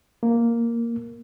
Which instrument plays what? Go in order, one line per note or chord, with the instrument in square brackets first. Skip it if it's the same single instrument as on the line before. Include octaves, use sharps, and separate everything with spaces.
[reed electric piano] A#3